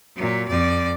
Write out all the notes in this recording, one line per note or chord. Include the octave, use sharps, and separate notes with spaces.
A#2 F#3
F2 D5